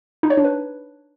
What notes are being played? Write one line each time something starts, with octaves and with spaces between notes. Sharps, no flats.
D#4
C#5
D4
B4